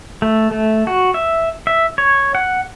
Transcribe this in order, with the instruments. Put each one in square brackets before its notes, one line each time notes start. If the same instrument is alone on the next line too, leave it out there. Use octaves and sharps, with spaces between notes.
[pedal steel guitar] A3
A3
F#4
E5
E5
C#5
F#5